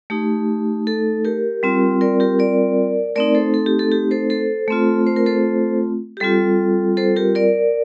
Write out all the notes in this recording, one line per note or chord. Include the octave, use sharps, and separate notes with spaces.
A3 D#4 G4
A4
G4 A#4
G3 C4 F4
A#4 D5
G4 A#4
A#4 D5
A3 C4 D#4 A#4 D5
A4 C5
A4
G4
A4
G4
A4 C5
A4 C5
A3 C4 F4
C5
A#4
A4 C5
G4
G3 C4 F4 A4
A4 C5
G4 A#4
A#4 D5